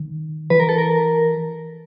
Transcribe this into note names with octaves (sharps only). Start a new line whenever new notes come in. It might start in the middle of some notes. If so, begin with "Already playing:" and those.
Already playing: D#3
E3 B4
A#4
A4
A#4